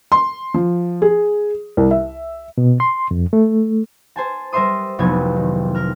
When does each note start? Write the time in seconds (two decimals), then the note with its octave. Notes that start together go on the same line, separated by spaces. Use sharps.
0.12 C6
0.54 F3
1.02 G#4
1.77 C2
1.91 E5
2.58 B2
2.80 C6
3.11 F2
3.33 A3
4.16 C5 G#5 A5
4.53 G3 A#4 C5 E5 C6 D#6
4.99 F1 C2 F#3 B3 G#6
5.36 D#3
5.75 A#4 F6